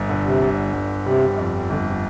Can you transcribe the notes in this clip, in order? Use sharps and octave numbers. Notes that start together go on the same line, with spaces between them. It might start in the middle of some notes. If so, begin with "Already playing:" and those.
Already playing: G1
A#2 D3
C3
G1
G1
C3 G3
F2
G1 D3
C3